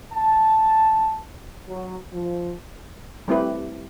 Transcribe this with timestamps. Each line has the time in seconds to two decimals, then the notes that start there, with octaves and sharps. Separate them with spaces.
0.13 A5
1.69 F#3
2.12 F3
3.28 G3 A3 C4 E4 G4 B4